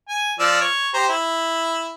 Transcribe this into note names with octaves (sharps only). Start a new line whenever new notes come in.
G#5
F3 D5 E6
C#5
G4 C5 A#5
E4